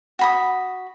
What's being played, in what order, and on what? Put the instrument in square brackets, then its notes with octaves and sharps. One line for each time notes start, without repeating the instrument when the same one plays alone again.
[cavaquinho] F#4 B5 D#6